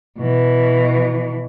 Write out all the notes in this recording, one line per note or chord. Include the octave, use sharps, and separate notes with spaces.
B2 E3